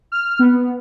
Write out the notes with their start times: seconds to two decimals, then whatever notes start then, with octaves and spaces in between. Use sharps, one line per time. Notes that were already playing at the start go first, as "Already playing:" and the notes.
0.12 F6
0.39 B3